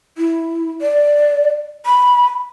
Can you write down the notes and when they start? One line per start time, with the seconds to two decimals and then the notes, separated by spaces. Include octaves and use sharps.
0.18 E4
0.81 D5
1.86 B5